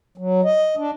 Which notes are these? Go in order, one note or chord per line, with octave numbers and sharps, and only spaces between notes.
F#3
D#5
D4